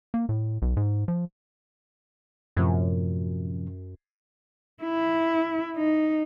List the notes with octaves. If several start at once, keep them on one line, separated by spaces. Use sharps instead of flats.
A#3
A2
B1
G#2
F3
F#2 A2 C3 F3
E4
D#4